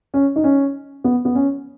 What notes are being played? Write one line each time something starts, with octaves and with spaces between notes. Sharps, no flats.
C#4
D#4
C#4
B3
B3
C#4